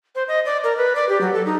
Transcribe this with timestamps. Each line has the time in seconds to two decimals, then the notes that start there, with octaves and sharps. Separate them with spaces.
0.15 C5
0.28 D#5
0.45 D5
0.64 A#4
0.77 B4
0.95 D5
1.09 G4
1.21 F#3
1.34 A4
1.46 D#4